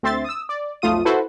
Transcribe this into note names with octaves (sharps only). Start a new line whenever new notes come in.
D2 C4 E5 C6 A6
D#6 E6
D5
B1 F2 A3 F4 D#6 D#7
E4 F#4 A4 B4 C5